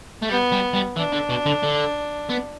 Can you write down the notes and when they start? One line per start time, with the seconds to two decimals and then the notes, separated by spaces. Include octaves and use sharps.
0.23 A3
0.30 G3 B3
0.52 G3
0.74 G3
0.97 E3 D4
1.13 D3
1.30 B2
1.46 D3
1.63 D3
2.29 B3